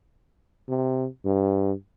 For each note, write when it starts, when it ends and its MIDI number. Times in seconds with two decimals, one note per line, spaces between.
0.69 1.07 48
1.25 1.73 43